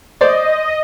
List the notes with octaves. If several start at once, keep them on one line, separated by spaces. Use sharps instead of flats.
C5 D5 D#5